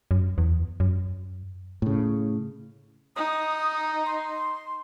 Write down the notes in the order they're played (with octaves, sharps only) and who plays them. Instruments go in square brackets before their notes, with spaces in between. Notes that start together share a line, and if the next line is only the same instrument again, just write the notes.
[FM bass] F#2
E2
F#2
[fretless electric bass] A2 C#3
[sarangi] D#4 [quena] D#6
[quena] C6